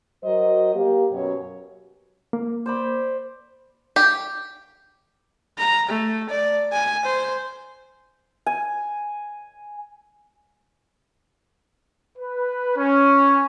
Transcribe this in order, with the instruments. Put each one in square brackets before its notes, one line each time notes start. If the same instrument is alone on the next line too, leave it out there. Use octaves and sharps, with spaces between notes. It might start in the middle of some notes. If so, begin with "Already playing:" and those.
[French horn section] F#3 F#4 A#4 C5 D#5
A#3 G4
F#2 B2 C#5
[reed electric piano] A#3
[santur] C5 D5 B5
[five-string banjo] G4
[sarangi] A#5
A3
D5
G#5
C5
[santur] G#5
[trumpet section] B4
C#4